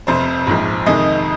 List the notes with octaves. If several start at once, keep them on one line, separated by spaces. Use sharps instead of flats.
F1 F2 C3 C5
A#1 G#2 F3
F2 C3 D#3 G#3 D#5